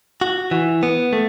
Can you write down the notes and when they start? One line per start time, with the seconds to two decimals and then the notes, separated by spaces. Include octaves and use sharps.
0.21 F#4
0.51 E3
0.83 B3
1.13 A3